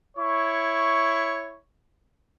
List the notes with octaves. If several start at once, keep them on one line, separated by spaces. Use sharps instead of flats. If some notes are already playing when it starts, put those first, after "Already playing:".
E4 C#5 C#6